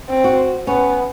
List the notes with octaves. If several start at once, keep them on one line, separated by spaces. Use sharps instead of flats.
C4
F#4
B3 C#4